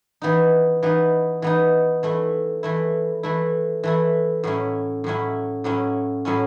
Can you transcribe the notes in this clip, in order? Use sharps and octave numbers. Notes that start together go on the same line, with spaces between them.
E3 B3 D#4
E3 B3 D#4
E3 B3 D#4
E3 A3 E4
E3 A3 E4
E3 A3 E4
E3 A3 E4
A2 F#3 C#4 E4
A2 F#3 C#4 E4
A2 F#3 C#4 E4
A2 F#3 C#4 E4